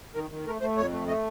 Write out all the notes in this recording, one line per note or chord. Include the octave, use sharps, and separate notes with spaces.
D#3 A#4
D#3
A3 A#4
A3 C5
F2 C#5
A3
A3 D#5